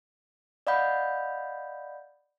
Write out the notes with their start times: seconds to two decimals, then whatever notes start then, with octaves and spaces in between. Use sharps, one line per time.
0.67 D5 D#5 F5 F#5 B5 G6